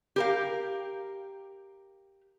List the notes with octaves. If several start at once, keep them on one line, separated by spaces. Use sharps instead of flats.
G4 A#4 F5